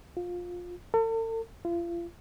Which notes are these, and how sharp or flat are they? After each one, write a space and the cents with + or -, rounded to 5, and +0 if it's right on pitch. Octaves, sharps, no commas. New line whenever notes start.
F4 +20
A4 +45
F4 -35